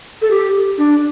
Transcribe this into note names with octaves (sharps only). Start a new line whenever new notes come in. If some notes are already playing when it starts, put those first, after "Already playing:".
A4
G4
D4